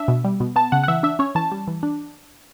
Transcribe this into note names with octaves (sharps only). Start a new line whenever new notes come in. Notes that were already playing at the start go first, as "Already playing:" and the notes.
Already playing: D4 E5
B2
G3
B2
B3 A5
C#3 F#5
F#5
E3 E5
D4 E5
C#4 C#5
E3 A5
G3
E3
D4